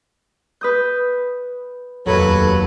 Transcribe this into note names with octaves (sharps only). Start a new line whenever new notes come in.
B4 D#6 G6
F1 D#2 F#3 A4 B4